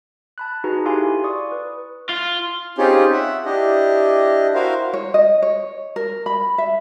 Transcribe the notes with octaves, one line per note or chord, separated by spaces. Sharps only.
A5 B5 F#6
D#4 F#4 G#4 B4 A#5
E4 G4 A4 F5 G#5 C6
D5 C#6 D#6
B4
F4
C4 C#4 D#4 F4 G4 G#4
E5 F#5
D4 E4 G4 D#5
E4 F#4 A#4 C5 F5
C#5
D#5
C#5
A#4
B5
E5